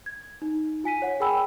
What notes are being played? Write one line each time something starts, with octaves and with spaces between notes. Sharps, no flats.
G#6
D#4
F4 G#5 B6 D#7
C#5 F#5
G#4 A#4 G5 G#5 B5 E6